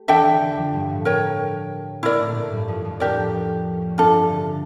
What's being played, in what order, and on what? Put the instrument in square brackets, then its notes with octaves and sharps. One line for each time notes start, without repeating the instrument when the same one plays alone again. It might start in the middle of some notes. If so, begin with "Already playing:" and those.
Already playing: [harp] A3 G4
[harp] E2 E3 [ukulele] D4 A4 E5 G5
[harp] E2 E3
D3
F2 F3
G2 G3
A2 A3
[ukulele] A#4 C#5 G5
[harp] A#2 A#3 [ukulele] E4 A#4 D5
[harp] A2 A3
A2 A3
G2 G3
F2 F3
F2 F3
[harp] A2 A3 [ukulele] D4 G4 A#4 D5
[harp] C#4
A#3
A3
[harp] G2 G3 [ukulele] D4 F4 A4
[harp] E2 E3
D3